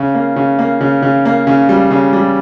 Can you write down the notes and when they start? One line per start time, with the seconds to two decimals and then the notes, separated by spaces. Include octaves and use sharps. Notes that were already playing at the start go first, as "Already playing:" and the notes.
Already playing: C#3
0.15 A#3
0.36 C#3
0.59 A#3
0.81 C#3
1.02 C#3
1.25 A#3
1.47 C#3
1.69 G3
1.91 C#3
2.13 G3